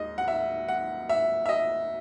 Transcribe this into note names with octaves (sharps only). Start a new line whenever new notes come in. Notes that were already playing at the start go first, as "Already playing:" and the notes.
Already playing: D#2 G#3 D#5
F#5
E5
F#5
E5
E5
D#5